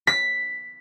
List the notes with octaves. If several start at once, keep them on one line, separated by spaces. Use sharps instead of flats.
B6